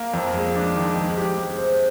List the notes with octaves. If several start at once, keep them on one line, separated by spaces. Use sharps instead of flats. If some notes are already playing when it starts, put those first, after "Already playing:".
Already playing: A#3
F2
G#3
D4
D#3
G#3
G4
G#3
C4